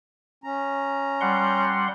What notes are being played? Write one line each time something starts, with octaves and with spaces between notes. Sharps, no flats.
C#4 A#5
G3 F#5 C6